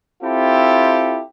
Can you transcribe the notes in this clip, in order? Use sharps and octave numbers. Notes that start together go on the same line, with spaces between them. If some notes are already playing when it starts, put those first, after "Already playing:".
C4 E4 F4 G4 A4